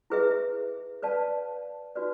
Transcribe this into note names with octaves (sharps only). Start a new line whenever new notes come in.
E4 G#4 B4 E5
B4 D5 F5 A5
D#4 F#4 B4 D5